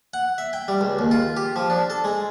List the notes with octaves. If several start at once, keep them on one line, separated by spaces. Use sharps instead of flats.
F#5
E5
G5
G3
C#2
D#2
F4
G4
F3
D4
A4
G#3